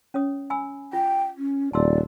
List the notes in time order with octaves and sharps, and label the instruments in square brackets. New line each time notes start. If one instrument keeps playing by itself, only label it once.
[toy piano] C#4 C#5 D#6
G#5 B5 E6
[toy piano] F4 [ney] G5
[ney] C#4
[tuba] D#1 [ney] D5 [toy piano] A5 C6 E6